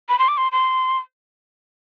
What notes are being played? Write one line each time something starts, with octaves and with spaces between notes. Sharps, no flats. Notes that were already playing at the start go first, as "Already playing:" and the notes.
B5
C6
D6
C6
C6